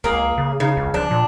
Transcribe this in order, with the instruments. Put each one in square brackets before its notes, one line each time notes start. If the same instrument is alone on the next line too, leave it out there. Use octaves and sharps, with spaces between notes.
[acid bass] C#2 [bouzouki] A#3 G#4
[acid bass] C#3
[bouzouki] C#3 [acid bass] D#4
[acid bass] C#2
[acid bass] F3 [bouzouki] D4
[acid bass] A#2